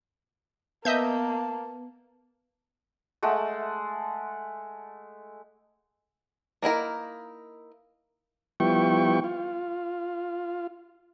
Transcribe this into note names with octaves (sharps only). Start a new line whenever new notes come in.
A#3 B3 D#5 E5 A5 G6
G#3 A3 F#5 A5
A#3 D#4 E4 A#4
F3 G3 B3 E4 G5 C#6
F4